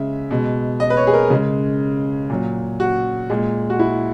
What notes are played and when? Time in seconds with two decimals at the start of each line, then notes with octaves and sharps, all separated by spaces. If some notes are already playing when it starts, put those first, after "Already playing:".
Already playing: C#3 G#3 E5
0.31 B2 G#3
0.80 D#5
0.90 B4
0.97 C#5
1.07 G#4
1.14 A#4
1.30 C#3 G#3
2.30 A#2 F#3
2.80 F#4
3.30 A#2 G#3
3.70 F#4
3.79 E4